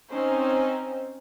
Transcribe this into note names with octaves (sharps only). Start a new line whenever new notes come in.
C4 C#4 D#4 C5